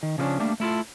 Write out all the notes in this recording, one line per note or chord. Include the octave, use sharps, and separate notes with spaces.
D#3
C#3 F3 G3 A#3 C#4 D4
G3 A3 A#3 D4
A3 E4 F4 A4